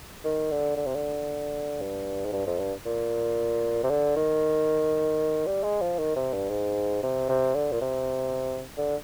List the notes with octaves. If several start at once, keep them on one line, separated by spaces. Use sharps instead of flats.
D#3
D3
D3
C3
D3
G2
G#2
G2
F2
G2
A#2
C3
D3
D#3
G3
G#3
F3
D#3
C3
G2
G#2
C3
C3
D3
A#2
C3
D3